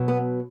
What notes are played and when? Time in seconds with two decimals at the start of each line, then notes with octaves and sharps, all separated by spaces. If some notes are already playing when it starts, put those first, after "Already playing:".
Already playing: B2 F#3
0.08 B3